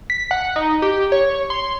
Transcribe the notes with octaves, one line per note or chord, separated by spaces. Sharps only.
B6
F#5
D#4
G4
C#5
C6